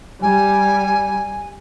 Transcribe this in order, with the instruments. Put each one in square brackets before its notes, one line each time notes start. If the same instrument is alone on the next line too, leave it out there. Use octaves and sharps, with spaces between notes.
[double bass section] G3 [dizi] G#5